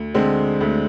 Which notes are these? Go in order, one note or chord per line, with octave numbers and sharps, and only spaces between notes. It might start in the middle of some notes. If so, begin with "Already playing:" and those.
Already playing: D2
D3 G#3 C4
D2